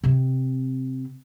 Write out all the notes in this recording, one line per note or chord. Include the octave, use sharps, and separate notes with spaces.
C3 C4